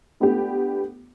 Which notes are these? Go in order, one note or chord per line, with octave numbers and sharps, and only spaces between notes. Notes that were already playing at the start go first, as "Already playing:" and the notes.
A3 B3 D4 F4 G4